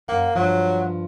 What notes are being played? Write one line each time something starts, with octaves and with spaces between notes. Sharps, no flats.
F#2 A#3 F#5
G2 F3 F#3